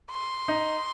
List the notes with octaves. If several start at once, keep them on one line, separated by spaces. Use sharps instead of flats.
C6
D#4